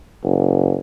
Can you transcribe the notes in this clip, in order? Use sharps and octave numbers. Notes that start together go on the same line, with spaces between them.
F#1